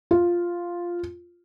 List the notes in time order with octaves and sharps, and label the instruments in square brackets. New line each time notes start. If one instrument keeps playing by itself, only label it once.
[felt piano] F4